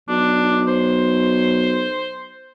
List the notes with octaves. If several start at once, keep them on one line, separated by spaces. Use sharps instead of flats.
B1 D4
C5